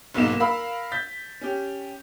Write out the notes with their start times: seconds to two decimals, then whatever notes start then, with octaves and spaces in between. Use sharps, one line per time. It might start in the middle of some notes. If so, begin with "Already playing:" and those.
0.14 F#1 B1 G#2 A#3 D#4 E7
0.40 A#4 F5 B5 E6
0.92 G6 A6 B6
1.41 C#4 G4